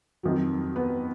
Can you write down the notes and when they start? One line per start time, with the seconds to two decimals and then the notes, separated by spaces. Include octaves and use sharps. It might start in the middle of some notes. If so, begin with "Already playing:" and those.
0.23 F2 D#3 F#3
0.76 B3